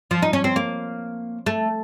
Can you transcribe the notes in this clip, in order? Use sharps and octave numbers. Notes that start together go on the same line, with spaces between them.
F3
D#4
C#4
C4
A#3
A3